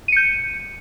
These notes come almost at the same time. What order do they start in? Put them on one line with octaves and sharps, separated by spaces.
D#7 C#7 G6